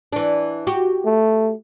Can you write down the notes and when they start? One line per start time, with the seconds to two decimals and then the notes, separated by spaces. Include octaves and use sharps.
0.13 E3 D4
0.67 F#4 G4
1.05 A3